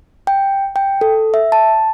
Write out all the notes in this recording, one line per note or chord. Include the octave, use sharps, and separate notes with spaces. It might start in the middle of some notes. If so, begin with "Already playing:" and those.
G5
G5
A4
E5
A5